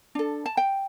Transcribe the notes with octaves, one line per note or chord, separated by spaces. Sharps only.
D4 A4
A5
G5